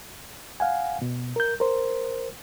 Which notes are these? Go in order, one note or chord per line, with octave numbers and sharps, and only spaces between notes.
F5 F#5 G#5
B2
A#4 G6
A#4 C5